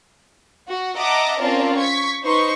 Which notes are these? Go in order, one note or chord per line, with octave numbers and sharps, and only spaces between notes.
F#4
D#5 E5 F#5 A5 A#5 D6
C4 C#4 F4 A#4 D5 A5
C#6 G#6 B6
D#4 B4 C5 C6 C#6